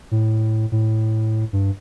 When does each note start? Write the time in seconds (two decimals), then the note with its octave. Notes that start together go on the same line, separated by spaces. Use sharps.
0.11 A2
0.72 A2
1.53 G2